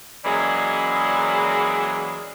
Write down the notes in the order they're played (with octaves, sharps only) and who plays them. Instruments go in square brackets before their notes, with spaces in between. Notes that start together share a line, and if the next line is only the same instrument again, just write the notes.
[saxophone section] E3 F#3 G#3 A#3 C#4 D5